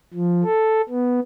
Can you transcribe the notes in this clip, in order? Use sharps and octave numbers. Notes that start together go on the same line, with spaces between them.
F3
A4
B3